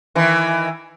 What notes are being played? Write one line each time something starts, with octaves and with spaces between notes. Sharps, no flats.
D#3 E3